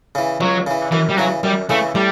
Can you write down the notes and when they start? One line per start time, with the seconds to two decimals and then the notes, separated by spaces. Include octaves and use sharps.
0.15 C#3 E3
0.40 C#2 F#3
0.67 C#3 E3
0.92 F#2 E3
1.10 G3
1.17 C#3 E3 F#3
1.43 F#2 G3
1.69 C#3 E3 A3
1.95 A2 G3